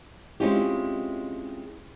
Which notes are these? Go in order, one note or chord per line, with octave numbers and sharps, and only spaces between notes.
G#3 C4 C#4 E4 F4 G4